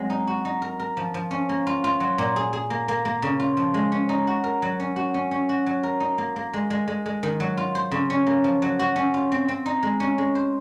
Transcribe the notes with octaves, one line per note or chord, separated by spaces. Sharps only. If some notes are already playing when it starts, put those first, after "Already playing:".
Already playing: F#3 G#3 C4
D#4
F#4
D#4
A#4
A#4
F3
F3
C#4
A#3
F4
F4
F#3
A#2
G#4
G#4
A#3
A#3
A#3
C#3
F4
F3
G#3
C#4
D#4
F#4
A#4
F#3
C#4
F#4
C#4
C#4
F#4
F#3
A#4
D#4
A#3
A#3
G#3
G#3
G#3
G#3
D#3
F#3
F4
C5
C#3
C#4
A#3
F3
F#3
F#4
C#4
F4
C4
C4
D#4
G#3
C#4
G#3
C5